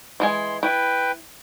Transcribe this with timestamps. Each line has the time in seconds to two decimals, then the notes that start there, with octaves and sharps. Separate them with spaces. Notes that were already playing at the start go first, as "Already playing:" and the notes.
0.20 E3 G#3 G#5 C6
0.63 E4 B4 G5